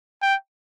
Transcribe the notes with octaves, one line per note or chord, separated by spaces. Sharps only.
G5